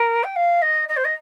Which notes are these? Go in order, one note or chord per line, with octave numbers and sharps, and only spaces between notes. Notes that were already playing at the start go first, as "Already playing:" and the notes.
Already playing: A#4
G5
F5
D#5
D#5
C5
D#5